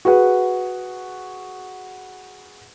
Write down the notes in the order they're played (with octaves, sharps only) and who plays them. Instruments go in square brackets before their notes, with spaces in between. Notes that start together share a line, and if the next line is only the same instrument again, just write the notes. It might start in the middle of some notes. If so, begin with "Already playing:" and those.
[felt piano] F#4 G#4 B4 F#5